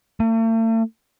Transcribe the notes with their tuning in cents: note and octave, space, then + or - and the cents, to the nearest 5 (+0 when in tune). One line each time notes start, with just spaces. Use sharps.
A3 +45